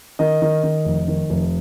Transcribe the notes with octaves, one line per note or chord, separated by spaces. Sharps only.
D#3 D#5
D#3
D#3
F1
D#3
F1